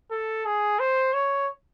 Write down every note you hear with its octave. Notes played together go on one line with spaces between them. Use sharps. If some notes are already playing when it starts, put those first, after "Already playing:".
A4
G#4
C5
C#5